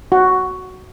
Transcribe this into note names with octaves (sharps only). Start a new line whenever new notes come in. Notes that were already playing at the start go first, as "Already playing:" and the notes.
F#4